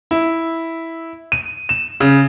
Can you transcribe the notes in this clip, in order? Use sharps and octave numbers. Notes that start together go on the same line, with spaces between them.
E4
D#7
E7
C#3